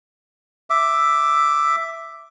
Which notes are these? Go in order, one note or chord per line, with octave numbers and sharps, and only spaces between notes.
E5 D6